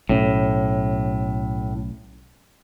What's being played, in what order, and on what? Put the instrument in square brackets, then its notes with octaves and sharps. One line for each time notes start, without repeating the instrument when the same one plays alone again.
[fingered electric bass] B1 C#4 [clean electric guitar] A2